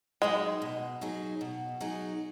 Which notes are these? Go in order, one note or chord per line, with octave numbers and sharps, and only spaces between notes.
F#3 G#3 D#4 G#4
B2
F#3 D#4 G#4
B2
F#3 D#4 G#4